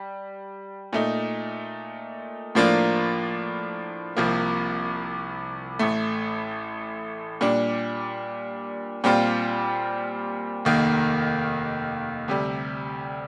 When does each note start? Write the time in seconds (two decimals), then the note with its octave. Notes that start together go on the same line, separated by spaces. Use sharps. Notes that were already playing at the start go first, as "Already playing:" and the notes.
Already playing: G3
0.93 A#2 A3 D#4
2.55 A2 F3 A#3 D4 F4
4.17 C2 C3 F3 A#3
5.79 A1 A2 A3
7.41 A#2 G3 D4
9.04 A#2 G3 C4 F4
10.65 F1 D#2 D#3 A#3
12.28 D2 C3 G3